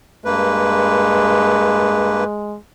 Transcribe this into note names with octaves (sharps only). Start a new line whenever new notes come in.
G2 G#3 A#3 B4